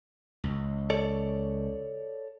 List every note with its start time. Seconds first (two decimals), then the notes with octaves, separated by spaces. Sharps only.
0.44 C#2
0.90 A4 C#5 D5